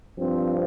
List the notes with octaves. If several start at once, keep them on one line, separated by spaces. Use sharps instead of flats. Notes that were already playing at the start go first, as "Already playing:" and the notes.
G2 F3 C4